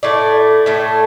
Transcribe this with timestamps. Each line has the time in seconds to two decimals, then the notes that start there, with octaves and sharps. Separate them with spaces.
0.03 A2 A3 D5
0.66 A2 A3